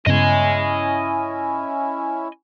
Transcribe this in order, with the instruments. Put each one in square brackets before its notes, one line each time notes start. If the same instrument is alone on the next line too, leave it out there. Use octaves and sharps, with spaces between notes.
[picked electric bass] G2 C#3 B3 [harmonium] C#4 E4 [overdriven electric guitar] D#5 G#5